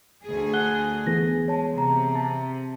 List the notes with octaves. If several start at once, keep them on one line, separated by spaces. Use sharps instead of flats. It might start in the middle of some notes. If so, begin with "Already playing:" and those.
D2 G#4
F#5 G#5 F#6 G7
E3 B3 G#4 A#6
G#3 C#5 A5
C3 A#5
A5